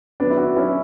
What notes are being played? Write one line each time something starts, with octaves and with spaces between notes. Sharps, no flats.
F#3 B3 D4
E4
D4 F#4
F#3 C#4 E4